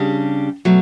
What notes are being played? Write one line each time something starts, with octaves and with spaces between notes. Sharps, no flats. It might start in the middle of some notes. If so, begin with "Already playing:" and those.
Already playing: C#3 G3 D4 G4
B2 F#3 A3